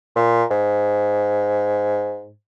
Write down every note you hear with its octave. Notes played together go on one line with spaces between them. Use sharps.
A#2
G#2